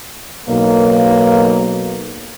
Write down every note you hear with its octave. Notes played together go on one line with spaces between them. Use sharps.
B1 A#3